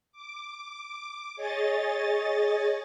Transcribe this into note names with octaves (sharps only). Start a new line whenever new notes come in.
D6
G#4 C#5 D#5 A6